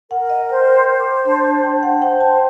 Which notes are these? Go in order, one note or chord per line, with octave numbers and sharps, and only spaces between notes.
A#4 F#5
D#5
C5 G5
C6
C5
D6
D4 C6
A5
D4 G5
F#5
C5 G5
A5